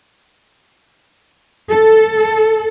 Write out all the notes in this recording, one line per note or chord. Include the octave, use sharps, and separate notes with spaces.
A4